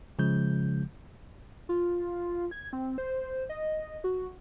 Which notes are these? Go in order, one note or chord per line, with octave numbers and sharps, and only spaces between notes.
C#3 F3 G#3 G6
F4
G#6
C4
C5
D#5
F#4